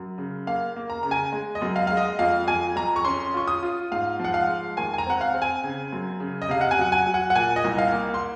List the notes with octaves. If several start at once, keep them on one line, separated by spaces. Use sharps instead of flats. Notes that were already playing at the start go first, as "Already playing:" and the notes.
Already playing: F#2
C#3
A#3 F5
A#3
A#5
C#3 A#5
G#5
G#3
D#5
F#2
F5
G#3 F5
D#5
F2 F5
F2 G#5
F2 A#5
C#6
C#4 C6
F4 C#6
D#6
F4
G#2 F5
F3
F#5
F5
G#3
D#2 G#5
G#5
A#5
C4 F#5
F5
C4
G#5
C#3
F#2
C#3
D#5
C3 F5
F#5
G#5
F#3 F#5
G#5
F#3
F#5
F#5
A#2 G#5
D#5
C2
F5
A#3
C6